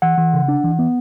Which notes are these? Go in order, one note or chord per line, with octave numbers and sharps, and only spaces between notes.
E3 F#5
E3
C#3
D4
E3
B3